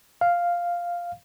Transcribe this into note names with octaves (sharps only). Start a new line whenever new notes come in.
F5